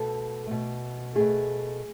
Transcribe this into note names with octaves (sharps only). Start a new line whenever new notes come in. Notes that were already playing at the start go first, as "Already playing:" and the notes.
Already playing: B2 A3 A4
B2 A3
B2 A3 G#4